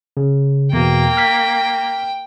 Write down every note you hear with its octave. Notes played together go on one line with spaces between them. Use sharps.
C#3
E2 B2 A#3 G5
F6 B6